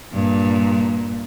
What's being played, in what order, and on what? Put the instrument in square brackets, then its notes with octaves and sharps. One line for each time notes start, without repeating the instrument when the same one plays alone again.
[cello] G2 A#2